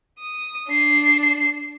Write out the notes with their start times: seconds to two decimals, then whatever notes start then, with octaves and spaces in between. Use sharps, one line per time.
0.19 D#6
0.68 D4 C7